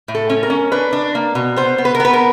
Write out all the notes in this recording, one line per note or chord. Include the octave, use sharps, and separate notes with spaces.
A2
A4
C#4
A#4
C#4
D4 B4
D4
A#3
B2
B3 C5
B3
B4
A#4
B3 B4
A#4